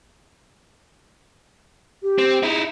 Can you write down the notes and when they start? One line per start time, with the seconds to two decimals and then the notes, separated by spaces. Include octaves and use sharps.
2.03 G4
2.18 C4
2.43 D#4 E4 G#4